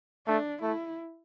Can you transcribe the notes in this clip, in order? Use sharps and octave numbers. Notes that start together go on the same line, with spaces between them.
A3 D4
A3 E4